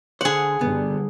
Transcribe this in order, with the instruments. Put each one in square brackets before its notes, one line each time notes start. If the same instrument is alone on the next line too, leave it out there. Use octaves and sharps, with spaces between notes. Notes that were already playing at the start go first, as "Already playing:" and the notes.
[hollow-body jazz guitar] D3 C5 [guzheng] G#4 F#5
[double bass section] G1 D3 G3 [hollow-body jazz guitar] B3